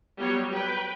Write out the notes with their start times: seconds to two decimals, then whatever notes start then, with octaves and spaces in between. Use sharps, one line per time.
0.18 F#3 G3 B3 C#5
0.51 B4 G5